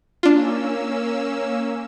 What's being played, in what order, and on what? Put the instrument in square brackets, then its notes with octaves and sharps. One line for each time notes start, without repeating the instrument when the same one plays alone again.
[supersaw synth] A#3 C#4 E6 [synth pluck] D4 F4